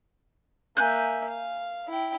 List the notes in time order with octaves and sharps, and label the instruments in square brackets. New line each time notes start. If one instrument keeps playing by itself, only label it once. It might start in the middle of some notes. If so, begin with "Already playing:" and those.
[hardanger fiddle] A#3 E5 [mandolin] G#5 F#6 G6
[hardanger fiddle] F5
E4 G5